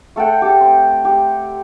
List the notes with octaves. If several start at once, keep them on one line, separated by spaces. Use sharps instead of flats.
A3 A4 F#5 G5
G4 A4
C4
G4